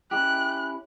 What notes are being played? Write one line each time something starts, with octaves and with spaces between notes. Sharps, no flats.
C#4 E4 G4 F#6